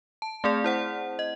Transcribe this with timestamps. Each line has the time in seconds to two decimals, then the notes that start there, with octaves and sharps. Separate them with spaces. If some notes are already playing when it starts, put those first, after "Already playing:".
0.22 A5
0.44 A3 C4 G#4 D5
0.64 E4 C5 F#5
1.19 D#5